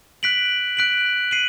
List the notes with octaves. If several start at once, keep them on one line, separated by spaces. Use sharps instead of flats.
F#6 B6 D7 F#7
F#6 B6 D7 F#7
C7 D#7 F#7